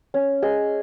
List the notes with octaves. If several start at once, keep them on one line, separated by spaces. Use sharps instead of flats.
C#4
G#4 D#5